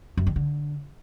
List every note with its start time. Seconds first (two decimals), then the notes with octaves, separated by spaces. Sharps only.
0.17 F#2
0.27 D#3
0.36 D3